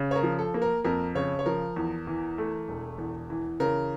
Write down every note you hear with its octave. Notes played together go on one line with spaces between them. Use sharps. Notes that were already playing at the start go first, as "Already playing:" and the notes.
Already playing: C#3
C#5
A#4
F3
A4
A#3
A#4
F2 A#4
C#3 C#5
C#5
F3 A#4
E2
E3
A3
E1
E2
E3
C#3 A#4